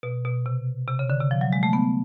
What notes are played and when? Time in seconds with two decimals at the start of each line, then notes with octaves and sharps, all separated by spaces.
0.03 B2
0.25 B2
0.46 C3
0.88 C3
0.99 C#3
1.10 D3
1.20 C3
1.31 F3
1.41 F#3
1.53 G#3
1.63 A3
1.73 B3